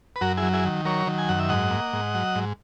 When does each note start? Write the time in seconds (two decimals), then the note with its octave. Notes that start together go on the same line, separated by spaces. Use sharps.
0.16 B4
0.21 F#2 F#4 A#4
0.37 E4 G#4
0.43 F#3
0.53 E4 G#4
0.65 D#3
0.85 F#3 A#4 C#5
1.07 D#3
1.18 G#5
1.28 F#2 F#5
1.39 E5
1.49 G#2 D#5 F#5
1.71 A#3
1.93 G#2
2.15 F#3
2.35 G#2